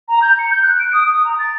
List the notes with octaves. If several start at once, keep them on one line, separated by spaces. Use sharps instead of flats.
A#5
G6
C#7
G6
F#6
D7
D#6
D#6
A#5
A6